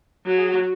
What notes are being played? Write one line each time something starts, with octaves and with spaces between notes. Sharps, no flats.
F#3 F#4
G#4
F#4
F#4